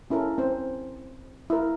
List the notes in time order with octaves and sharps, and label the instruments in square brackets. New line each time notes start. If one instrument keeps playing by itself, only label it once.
[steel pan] C#4 E4 A4 A#4
C4 C#4 C5
E4 A#4